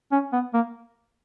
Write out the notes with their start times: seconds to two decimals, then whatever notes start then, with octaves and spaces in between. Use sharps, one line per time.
0.12 C#4
0.33 B3
0.54 A#3